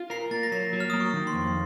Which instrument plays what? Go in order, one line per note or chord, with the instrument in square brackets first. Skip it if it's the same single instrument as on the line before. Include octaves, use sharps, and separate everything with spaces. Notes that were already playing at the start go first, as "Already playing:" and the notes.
Already playing: [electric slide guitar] F4
[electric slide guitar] A#4 [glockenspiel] C7
[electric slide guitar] A#3 [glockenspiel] A6
[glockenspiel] A#6
[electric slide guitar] F#3 [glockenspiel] C7
[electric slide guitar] F#3
[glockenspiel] F6
[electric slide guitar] A#3 [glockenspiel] D#6
[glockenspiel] C#6
[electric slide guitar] D#3
[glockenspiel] C6
[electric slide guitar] F2